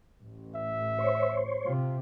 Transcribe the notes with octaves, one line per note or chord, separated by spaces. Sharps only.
A1
E5
C5 C#5
C3 F4